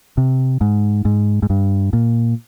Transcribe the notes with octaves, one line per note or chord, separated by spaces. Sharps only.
C3
G#2
G#2
G#2
G2
A#2